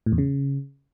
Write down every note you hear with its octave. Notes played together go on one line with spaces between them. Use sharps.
A2
E2
C#3